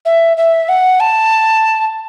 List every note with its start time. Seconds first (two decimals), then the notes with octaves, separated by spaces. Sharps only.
0.06 E5
0.37 E5
0.69 F#5
1.00 A5